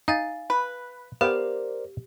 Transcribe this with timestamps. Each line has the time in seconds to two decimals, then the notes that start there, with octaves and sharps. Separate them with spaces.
0.08 D#4 F5 G#5 A6
0.50 B4
1.21 B3 G4 A#4 C5 D5 F5 G5